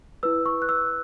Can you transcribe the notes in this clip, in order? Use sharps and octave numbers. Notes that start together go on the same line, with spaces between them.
E4 B4 E6
C#6
F#6
E6